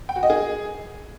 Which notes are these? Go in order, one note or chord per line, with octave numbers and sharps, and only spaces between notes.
G5
F#4
D#5
G#4